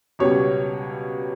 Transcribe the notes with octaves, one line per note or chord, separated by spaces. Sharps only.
C#2 B2 G3 C#5